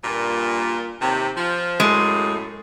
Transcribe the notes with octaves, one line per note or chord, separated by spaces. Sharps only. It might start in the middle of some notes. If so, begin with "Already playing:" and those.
G2 A#2
D#2 C3
F3
F#2 A2 G#3